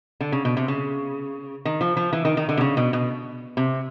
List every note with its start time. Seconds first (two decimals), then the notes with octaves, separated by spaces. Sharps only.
0.21 D3
0.32 C#3
0.45 B2
0.57 C3
0.68 C#3
1.65 D#3
1.81 F3
1.97 F3
2.13 E3
2.25 D#3
2.37 D#3
2.49 D3
2.57 C3
2.61 C#3
2.77 B2
2.93 B2
3.57 C3